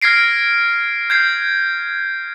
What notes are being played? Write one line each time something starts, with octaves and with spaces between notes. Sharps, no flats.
F6 G#6 A#6 C7 D7
G6 G#6 C7